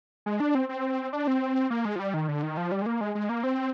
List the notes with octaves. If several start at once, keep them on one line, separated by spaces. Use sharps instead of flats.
G#3
D4
C4
C4
D4
C4
A#3
G#3
F3
G3
D#3
D3
D#3
F3
G3
G#3
A#3
G#3
G#3
A#3
C4